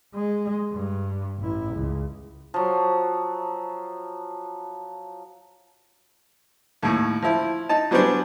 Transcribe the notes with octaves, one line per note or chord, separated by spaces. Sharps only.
G#3
G2
A1 E4
C#2
F3 F#3
D#2 A2
F3 E4
D#4 A5
F#3 G3 B3 C#4 D4 C5